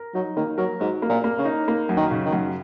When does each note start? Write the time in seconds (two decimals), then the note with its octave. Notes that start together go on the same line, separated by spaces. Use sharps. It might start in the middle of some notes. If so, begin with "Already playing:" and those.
Already playing: A#4
0.15 F#3 D#4
0.36 D#3 A#3
0.58 F#3 A#4
0.80 G#2 F#3
1.02 A#3
1.09 A#2
1.24 A#3
1.38 C#3
1.45 D#4
1.68 A#3
1.89 F#2
1.97 D#3
2.11 C#3
2.26 D#3
2.33 F#2